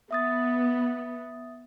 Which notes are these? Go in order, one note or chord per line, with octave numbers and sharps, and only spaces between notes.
B3 E5 D#6 A6